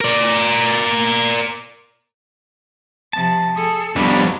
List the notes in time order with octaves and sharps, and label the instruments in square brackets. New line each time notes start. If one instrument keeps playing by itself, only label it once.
[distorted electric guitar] A#4 D5
[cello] C3 F3 [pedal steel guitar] A5
[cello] G#4 A4
[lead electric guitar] F2 G3 [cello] F#3 [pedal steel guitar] B3 C4 D4